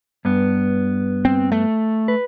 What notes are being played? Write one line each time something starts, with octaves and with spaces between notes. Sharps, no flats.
G2 B3
C4
A3
B4